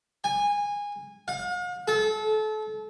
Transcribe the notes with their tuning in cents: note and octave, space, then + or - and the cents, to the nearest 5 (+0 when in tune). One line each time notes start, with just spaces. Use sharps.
G#5 -20
F5 +45
A4 -30